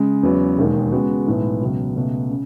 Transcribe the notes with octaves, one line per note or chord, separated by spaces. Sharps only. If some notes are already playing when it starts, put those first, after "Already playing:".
Already playing: C#3 G#3
E2 C#3 F#3 B3
E1 D#2 D#3 G#3
C#3 G#3 B3 F#4
B1 A2 E3 G#3 B3
C#2 B2 F#3
C#2 B2 A3
C#3